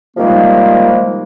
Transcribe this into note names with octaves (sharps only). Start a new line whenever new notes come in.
C3 D#3 F3 G3 G#3 A#3